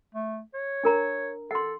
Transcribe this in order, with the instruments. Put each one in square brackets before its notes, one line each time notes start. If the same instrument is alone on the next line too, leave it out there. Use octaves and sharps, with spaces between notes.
[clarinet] A3
C#5
[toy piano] D4 A#4 A#5
[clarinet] A4 [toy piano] F#5 C6